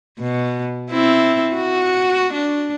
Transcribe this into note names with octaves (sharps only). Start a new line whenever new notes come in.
B2
C4 E4
F#4
D4